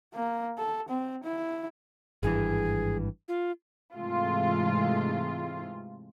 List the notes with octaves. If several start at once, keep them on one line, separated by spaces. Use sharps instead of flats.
A#3
A4
C4
E4
G#1 G2 E3 G#4
F4
G#2 C3 E3 G#3 A3 F4